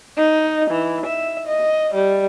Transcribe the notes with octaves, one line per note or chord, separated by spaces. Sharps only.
D#4
E3
E5
D#5
G3